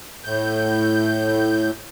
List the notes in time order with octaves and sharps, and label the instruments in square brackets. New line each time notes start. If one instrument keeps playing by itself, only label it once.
[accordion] A2 G6